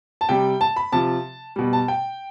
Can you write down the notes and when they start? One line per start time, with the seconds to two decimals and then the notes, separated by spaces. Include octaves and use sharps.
0.21 A5
0.29 C3 G3 G5
0.61 A5
0.76 B5
0.92 C3 F3 A5
1.56 B2 G3
1.73 A5
1.88 G5